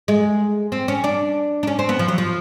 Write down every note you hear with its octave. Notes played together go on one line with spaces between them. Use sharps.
G#3
C4
C#4
D4
D4
C#4
C4
B3
F3
F#3
F3